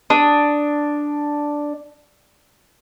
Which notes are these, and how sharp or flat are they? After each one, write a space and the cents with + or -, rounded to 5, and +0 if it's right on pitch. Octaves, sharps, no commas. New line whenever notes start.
D4 +0 D#6 +5